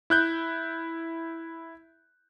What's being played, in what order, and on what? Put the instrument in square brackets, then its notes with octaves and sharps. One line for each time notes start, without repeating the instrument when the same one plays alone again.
[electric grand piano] E4 F#6 G6